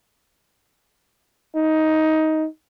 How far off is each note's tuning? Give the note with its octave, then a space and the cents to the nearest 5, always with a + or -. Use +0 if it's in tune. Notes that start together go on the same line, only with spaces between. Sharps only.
D#4 +15